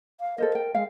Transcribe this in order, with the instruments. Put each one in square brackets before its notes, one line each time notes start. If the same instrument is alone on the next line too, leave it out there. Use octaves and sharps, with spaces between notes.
[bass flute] F5
[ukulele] A4 C5 D#5 [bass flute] A#4
[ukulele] G5
[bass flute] G#3 [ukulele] F5